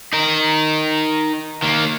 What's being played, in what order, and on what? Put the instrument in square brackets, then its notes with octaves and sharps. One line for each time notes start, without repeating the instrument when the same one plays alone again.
[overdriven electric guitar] D#4 A#4
D#3 A#3